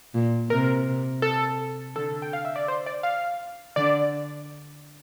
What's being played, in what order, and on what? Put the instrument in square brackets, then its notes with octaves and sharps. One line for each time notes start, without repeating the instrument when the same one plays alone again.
[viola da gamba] A#2
[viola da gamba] C3 [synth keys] A#4
[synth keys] A4
[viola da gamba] D3 [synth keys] A4
[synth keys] G5
F5
E5
D5
C5
D5
F5
[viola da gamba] D3 [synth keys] D5